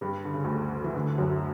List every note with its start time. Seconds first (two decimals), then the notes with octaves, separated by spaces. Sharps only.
0.01 G2 G3
0.25 D3
0.34 C#3
0.45 D2 D3
0.84 E3
0.95 D2 D3
1.18 F#2 F#3